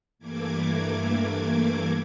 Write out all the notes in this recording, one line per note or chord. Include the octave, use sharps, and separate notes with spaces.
G2 E3 A3 A#3 D6 G#6